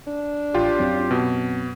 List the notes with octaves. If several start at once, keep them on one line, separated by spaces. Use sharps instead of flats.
D4
A1 F4 G4 G5
F#2 F#3 C4
B2